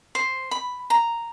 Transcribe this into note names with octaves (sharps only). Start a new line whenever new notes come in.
C5
B5
A#5